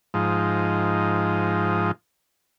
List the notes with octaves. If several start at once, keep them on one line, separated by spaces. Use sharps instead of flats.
G#2 F3 D#4